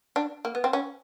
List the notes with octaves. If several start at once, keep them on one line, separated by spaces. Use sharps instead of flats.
D4
A#3
B3
C4
C#4